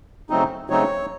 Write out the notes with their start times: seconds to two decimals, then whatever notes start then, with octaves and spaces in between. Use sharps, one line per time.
0.30 C#3 F#3 A3 C4 D#4
0.70 C#3 F#3 A3 C4 D#4 C#5